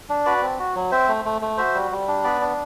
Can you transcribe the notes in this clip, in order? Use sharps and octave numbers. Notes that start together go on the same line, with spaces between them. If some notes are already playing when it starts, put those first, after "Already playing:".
D4
F#4 B4 D5
C4
F#4
F#3
C4 C5 E5
A3
A3
A3
F#4 C5 E5
G3
G3
D4
B3 B4 D5
D4